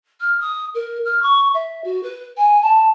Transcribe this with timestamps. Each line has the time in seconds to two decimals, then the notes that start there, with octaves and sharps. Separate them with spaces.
0.20 F6
0.40 D#6
0.74 A#4
1.05 F6
1.22 C#6
1.54 E5
1.84 F#4
2.03 B4
2.37 G#5
2.62 A5